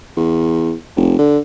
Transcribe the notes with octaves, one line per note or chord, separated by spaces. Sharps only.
E2
F1
D3